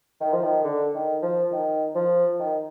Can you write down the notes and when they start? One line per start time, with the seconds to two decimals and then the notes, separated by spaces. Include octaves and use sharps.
0.21 D#3
0.32 F3
0.43 D#3
0.64 D3
0.94 D#3
1.22 F3
1.52 D#3
1.95 F3
2.39 D#3